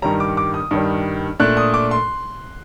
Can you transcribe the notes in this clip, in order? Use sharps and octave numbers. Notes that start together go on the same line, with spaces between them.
G2 D#3 G3 A#5
D6
D6
D#6
G2 D#3 G3
A#2 A3 D4 F#6
D#6
D6
C6